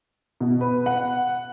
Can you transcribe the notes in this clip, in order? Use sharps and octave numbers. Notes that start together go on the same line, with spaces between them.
B2
B4
F#5